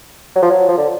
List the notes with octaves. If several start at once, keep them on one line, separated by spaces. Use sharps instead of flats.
F#3
F3
F#3
F3
D3